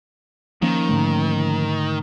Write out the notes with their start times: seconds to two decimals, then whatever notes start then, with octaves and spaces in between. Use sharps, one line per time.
0.62 D#3 F3 A#3 C#4
0.89 G#2 D3 A3